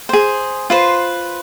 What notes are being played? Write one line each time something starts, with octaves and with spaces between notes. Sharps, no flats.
G#4 C5
F4 B4 C5